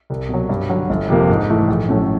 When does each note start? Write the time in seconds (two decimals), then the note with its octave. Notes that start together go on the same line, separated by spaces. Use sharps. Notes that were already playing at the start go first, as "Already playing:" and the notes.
0.10 C2
0.29 B2 F#3
0.49 G2
0.70 D3 F#3
0.90 G1
1.08 F2 C3 F3 A#3
1.29 G#2
1.49 E3 A3
1.68 A#1
1.89 A2 F#3 A3 C#4